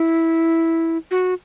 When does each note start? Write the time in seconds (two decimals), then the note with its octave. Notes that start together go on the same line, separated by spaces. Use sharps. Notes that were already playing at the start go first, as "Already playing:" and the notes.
Already playing: E4
1.11 F#4